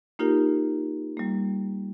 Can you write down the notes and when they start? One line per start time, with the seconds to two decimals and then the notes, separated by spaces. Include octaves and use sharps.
0.19 A#3 D#4 F4 G4 A#4
1.17 G3 A#3